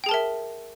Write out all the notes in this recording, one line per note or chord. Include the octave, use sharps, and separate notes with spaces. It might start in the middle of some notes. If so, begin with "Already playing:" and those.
G#4 A#4 E5 G5 A5